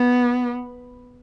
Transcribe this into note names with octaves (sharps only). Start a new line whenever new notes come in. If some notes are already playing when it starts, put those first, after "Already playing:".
Already playing: B3